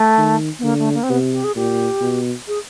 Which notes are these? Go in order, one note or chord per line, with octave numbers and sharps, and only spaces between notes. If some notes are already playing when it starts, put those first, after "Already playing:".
Already playing: A3
D#3
B3
D3 A#3
A3
A#3
C4
C3 B3
G4
G#4
A#2 G4
B2
G#4